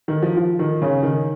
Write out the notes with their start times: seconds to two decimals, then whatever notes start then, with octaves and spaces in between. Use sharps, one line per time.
0.08 D#3
0.22 F3
0.37 F3
0.59 D#3
0.82 C#3
1.03 D#3